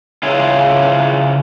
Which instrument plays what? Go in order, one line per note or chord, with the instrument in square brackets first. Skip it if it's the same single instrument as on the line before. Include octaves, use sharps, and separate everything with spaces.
[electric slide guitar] C#3 E4 F4 G#4